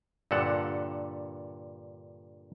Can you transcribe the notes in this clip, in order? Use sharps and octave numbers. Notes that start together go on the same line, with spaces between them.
G2 A#2 D3 A4 F#5